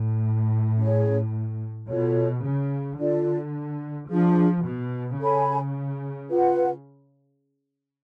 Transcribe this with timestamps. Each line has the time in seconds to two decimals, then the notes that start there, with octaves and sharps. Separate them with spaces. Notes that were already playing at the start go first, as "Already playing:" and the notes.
Already playing: A2
0.78 C#4 G#4 C#5
1.88 B2 F4 A4 C#5
2.44 C#3
2.98 D3 D4 F4 A4 D5
4.09 F3 D4 F4 G#4
4.65 B2
5.19 C#3 A4 C#5 G#5 B5
6.30 F4 B4 F#5